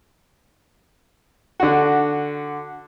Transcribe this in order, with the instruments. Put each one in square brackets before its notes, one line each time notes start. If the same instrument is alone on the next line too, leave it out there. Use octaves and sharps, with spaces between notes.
[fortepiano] D3 F#4